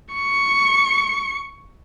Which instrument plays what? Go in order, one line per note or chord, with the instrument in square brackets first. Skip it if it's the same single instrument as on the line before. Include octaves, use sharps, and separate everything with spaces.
[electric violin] C#6 C#7